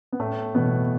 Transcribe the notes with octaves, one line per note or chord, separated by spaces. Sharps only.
B3
A2 A3
B2 E3 B3